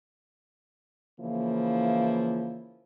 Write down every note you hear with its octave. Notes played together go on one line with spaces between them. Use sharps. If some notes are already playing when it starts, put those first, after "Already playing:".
C#3 E3 F3 A#3 E4